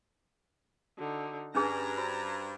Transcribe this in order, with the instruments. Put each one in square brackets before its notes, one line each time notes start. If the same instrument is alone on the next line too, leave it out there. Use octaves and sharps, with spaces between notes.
[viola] D3 D#4 [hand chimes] F#4
[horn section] G2 [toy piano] C#4 D4 G#4 [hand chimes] B4 G#5 F6 [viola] A#5
[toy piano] F#4 [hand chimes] C5 B5